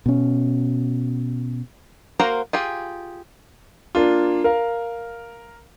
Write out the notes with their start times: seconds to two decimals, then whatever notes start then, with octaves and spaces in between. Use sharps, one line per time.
0.06 B2 C#4
2.20 A#3 F#4 A#4 C5 A#5
2.53 F4 G4 G#4
3.95 A#3 D4 F4
4.44 A#4 F5